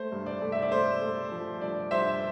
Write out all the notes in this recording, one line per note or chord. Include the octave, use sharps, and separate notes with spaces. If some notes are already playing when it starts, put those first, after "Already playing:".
Already playing: A3 C5
G2
D5
A3
E5
D5
A3 C5
A3
F3
G2 D5
G2 C5 E5